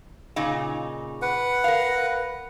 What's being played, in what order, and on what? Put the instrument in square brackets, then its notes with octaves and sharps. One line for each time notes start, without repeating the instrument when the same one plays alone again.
[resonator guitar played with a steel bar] A#2 C#3 D#4
[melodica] B4 F#5
[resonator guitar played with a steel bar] A#4 F5